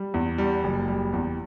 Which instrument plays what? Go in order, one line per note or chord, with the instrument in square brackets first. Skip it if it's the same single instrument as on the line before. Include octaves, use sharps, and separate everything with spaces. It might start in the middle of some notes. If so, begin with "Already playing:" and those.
Already playing: [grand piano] G3
E2
G3
F#1
G3
E2